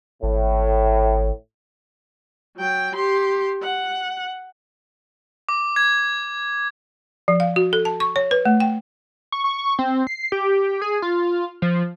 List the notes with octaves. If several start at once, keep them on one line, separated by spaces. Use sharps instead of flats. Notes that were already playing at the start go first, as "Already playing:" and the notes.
G#1 A2
F#3 G5
G4 C6
F#5
D6
G#6
F3
F5
F#4
A4
A5
C#6
C#5
B4
A3
G5
C#6
C#6
C4
C7
G4
G#4
F4
F3